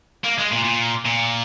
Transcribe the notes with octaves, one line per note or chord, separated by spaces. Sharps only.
A#3
G#3
A#2
A#2
A#2